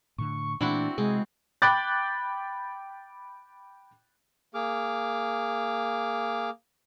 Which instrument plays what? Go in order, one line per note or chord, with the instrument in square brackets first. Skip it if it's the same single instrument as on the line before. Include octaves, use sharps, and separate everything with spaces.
[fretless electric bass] A2 D3 [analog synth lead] C#6
[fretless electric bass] A#2 E3 A3 [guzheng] C4 E4 F#4 [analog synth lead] D4
[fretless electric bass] C3 [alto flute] G#3 [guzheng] C4 [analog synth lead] G#4
[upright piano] G5 B5 D6 F#6 G6 A6
[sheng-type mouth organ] A#3 G#4 D6 F6